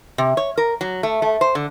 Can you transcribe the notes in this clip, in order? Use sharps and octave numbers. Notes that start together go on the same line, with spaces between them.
C3
C#5
A#4
F#3
A3
A3
C5
D3